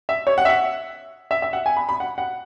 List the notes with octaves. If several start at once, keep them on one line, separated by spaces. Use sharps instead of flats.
E5
C#5
F#5
E5
F#5
E5
E5
F#5
G#5
B5
B5
F#5
F#5